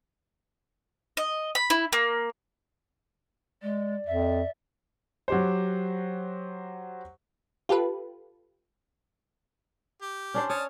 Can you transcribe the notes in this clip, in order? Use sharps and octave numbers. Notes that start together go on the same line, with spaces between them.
D#5
B5
E4
A#3
G#3 D5
F2 E5
F#3 G4 C5
F4 G4 A4 B4
G4
C#4 D4 C5
C#5 A5 D#6 F6